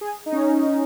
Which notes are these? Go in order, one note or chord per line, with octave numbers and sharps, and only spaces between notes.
G#4
D#4
C#4